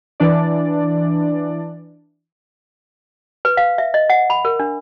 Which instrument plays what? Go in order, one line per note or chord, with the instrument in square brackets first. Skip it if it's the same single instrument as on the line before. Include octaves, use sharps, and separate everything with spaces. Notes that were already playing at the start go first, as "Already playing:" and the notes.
[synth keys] E3 D4 D5
[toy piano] B4
F5
E5
D#5
F#5
B5
A#4
D4